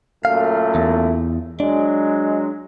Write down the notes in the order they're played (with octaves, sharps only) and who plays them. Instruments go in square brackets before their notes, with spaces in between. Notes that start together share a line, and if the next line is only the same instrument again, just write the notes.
[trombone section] F#2 A#2 A3 [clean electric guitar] F5
[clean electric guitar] E2
[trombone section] F#3 G#3 [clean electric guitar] D4